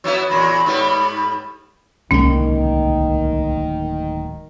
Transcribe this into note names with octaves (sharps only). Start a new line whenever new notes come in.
F#3 B3 E4
E2 A#2 F#3 B5
G#2 G3 B3
D1 C2 D#3 G#3 A#3 C#4